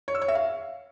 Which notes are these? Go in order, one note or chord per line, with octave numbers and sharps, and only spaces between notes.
C#5
E6
C#5
E5
F5